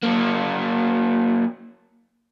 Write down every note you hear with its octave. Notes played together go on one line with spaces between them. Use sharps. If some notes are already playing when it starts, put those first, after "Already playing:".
F#3 A#3